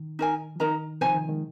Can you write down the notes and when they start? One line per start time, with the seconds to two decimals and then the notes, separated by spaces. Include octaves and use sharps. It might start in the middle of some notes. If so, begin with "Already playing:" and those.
Already playing: D#3
0.19 D#4 A#4 G#5
0.56 F3
0.60 D#3 D#4 A#4 D#5 A#5
1.01 C3 F3 D#4 C5 G#5
1.14 D#3
1.28 D#3 G#3